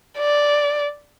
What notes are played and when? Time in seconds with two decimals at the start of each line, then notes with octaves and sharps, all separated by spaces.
0.19 D5